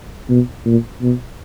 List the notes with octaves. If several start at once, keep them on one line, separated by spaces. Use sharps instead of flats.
B2
A#2
B2